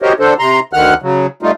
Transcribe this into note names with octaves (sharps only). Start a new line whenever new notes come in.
F#4 G4 A#4 C5 C#5 D#5
D3 D4 A4 C5
C3 A#5 C6
D2 D3 D#3 F#5 F6 F#6
C#3 F#3
G3 A3 D#4 F4